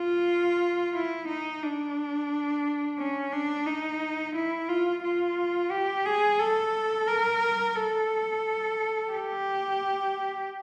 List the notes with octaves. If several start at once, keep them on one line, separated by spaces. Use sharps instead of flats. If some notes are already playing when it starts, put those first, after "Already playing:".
Already playing: F4
E4
D#4
D4
C#4
D4
D#4
E4
F4
F4
G4
G#4
A4
A#4
A4
G4